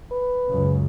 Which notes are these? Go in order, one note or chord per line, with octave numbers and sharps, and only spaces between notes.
B4
C#2 F#2 C#3